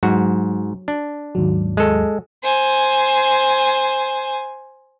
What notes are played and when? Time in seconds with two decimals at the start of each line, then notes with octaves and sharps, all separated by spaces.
0.03 G#2 F#3 F#4
0.88 D4
1.35 D#2 G#2 F#3
1.77 G#3 A4
2.44 C5 G#5